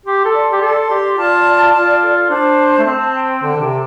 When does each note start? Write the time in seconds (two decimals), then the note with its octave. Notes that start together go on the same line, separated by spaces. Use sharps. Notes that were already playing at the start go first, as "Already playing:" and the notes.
0.06 G4 C6
0.25 A4
0.34 D5
0.52 G4
0.61 A4 C6
0.90 G4 D5
1.18 F4 A5
1.46 D5
1.74 F4 A5
2.03 A4
2.30 D4 C5
2.58 A5
2.79 A3
2.86 C4 C5
3.15 G5
3.42 D3 A5
3.56 D3
3.61 C3
3.71 A4